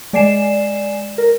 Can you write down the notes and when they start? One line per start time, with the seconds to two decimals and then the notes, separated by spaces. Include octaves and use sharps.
0.13 G#3 D5 G#5 C7 E7
1.18 A#4